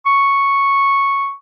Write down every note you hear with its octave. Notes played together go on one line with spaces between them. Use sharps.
C#6